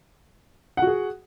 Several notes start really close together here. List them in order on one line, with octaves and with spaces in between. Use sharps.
F#5 F#4 G#4